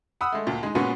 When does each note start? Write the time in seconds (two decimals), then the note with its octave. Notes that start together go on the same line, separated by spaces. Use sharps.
0.21 F#5 B5 D#6 E6
0.32 G#3 A3
0.47 D2 A#2
0.63 G#3 D#4
0.75 A#2 G#3 B3 C#4 F#4